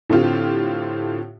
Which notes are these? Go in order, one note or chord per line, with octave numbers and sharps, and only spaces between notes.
A2 D3 C4 F4 G4